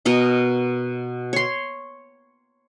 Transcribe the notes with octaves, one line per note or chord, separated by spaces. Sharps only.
B2 A#4 D#5
C#5 C6